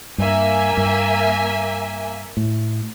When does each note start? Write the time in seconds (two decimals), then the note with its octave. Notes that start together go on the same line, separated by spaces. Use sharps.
0.18 G2 A#3 E5 G#5
0.77 G2
2.37 A2